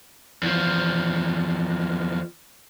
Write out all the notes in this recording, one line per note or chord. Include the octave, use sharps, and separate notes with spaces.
E2 F3